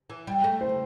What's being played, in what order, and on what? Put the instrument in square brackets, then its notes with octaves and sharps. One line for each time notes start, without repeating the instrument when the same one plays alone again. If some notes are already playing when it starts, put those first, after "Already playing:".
[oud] E3
G3
A3
[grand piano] C5